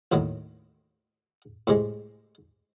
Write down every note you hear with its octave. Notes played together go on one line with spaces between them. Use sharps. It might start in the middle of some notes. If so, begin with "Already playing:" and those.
D#2 A2 D#3 F#3
A2 C3 G#3